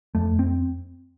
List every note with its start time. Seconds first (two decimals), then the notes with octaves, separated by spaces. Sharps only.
0.15 F2 A3
0.39 C4